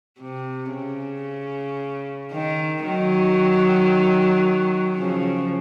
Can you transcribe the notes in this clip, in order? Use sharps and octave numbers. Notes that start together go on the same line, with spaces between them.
C3
C#3
D#3
D#3 F#3
C#3 F3